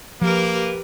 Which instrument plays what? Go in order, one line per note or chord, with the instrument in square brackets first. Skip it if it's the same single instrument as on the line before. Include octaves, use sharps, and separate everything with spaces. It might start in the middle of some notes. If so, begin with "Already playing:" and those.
[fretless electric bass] F3 [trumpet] A#3 [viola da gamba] G4 A#4 B4